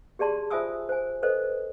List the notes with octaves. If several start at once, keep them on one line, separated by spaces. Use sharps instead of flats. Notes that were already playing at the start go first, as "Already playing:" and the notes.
G4 G#4 D5 A5 C6
F4 C5 E5 G#5 D#6 E6
C5 G#5
A4 B4 C5 D#5